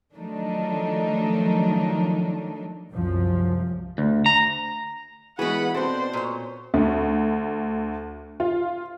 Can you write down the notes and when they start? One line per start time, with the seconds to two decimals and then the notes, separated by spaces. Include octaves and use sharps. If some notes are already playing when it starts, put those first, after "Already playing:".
0.14 D#3 F3 F#3 A3 D4 D#4
2.92 C2 F#2 F3
3.98 D2
4.26 A#5
5.39 E3 G#3 B3 F#4 G#4 B4 F#5 B5
5.74 B2 C4 D4 A4 C5
6.13 A#2 C#5
6.74 D2
8.40 F4